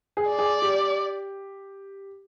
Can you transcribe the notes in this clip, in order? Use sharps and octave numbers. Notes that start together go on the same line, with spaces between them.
G#4
D5
G#4
G4